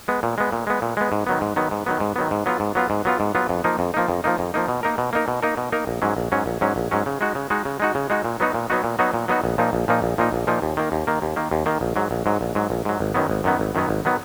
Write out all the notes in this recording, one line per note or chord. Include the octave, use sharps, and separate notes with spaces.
G#3 B3
A#2
G#3 B3
A#2
G#3 B3
A#2
G#3 B3
G#2
D#3 F#3 B3
G#2
D#3 F#3 B3
G#2
D#3 F#3 B3
G#2
D#3 F#3 B3
G#2
F#3 B3 F4
G#2
F#3 B3 F4
G#2
F#3 B3 F4
G#2
F#3 B3 F4
F2
F3 A#3 D#4
F2
F3 A#3 D#4
F2
F3 A#3 D#4
F2
F3 A#3 D#4
B2
A#3 D#4 A#4
B2
A#3 D#4 A#4
B2
A#3 D#4 A#4
B2
A#3 D#4 A#4
A#1
G#2 F#3 C#4
A#1
G#2 F#3 C#4
A#1
G#2 F#3 C#4
A#1
G#2 F#3 C#4
C#3
G#3 D#4 F#4
C#3
G#3 D#4 F#4
C#3
G#3 D#4 F#4
C#3
G#3 D#4 F#4
A#2
F#3 B3 D#4 F#4
A#2
F#3 B3 D#4 F#4
A#2
F#3 B3 D#4 F#4
A#2
F#3 B3 D#4 F#4
A#1
A#2 F3 A#3 D#4
A#1
A#2 F3 A#3 D#4
A#1
A#2 F3 A#3 D#4
A#1
A#2 F3 A#3 D#4
D#2
D#3 A#3
D#2
D#3 A#3
D#2
D#3 A#3
D#2
D#3 A#3
A#1
G#2 F#3
A#1
G#2 F#3
A#1
G#2 F#3
A#1
G#2 F#3
G#1
F#2 D#3 F#3 B3
G#1
F#2 D#3 F#3 B3
G#1
F#2 D#3 F#3 B3
G#1
D#3 F#3 B3